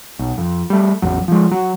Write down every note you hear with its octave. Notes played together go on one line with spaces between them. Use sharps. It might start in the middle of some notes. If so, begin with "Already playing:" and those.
B1
F2
G3 A3
A1 E2 F#3
F3 G#3
F#3